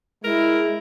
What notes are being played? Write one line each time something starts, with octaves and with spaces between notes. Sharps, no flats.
G#3 E4 A#4